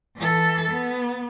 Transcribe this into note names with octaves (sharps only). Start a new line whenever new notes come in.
E3 A4
B3